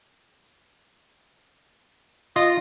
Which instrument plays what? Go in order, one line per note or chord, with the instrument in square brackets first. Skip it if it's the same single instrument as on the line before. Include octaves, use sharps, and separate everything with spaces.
[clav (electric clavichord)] F4 [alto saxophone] D#5